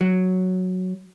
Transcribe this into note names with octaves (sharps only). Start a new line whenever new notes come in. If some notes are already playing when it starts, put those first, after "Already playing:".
F#3